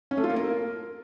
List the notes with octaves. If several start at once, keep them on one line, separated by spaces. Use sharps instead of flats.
C#4
A3
F4
A#3
A#4